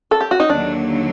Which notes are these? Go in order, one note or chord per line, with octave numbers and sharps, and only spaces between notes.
A4
G4
F#4
D#4
D#2 D3 F#3 D4